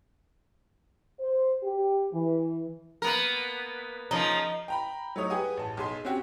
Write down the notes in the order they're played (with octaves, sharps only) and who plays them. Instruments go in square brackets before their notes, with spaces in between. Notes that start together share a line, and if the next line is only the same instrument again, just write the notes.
[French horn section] C5
G4
E3
[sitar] A#3 B3 A#4
[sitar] C#3 F3 A#3 [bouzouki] D#4
[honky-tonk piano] G5 A#5 B5
F#3 A3 D#4 C#5 D#6
G4 G#4 B4 F#5 G#5 D#6
A1 A5
B1 G#4 C6
C4 C#4 F#4 G4